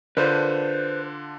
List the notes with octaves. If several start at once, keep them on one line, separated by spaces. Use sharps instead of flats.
D3 D4 F4 B4 C5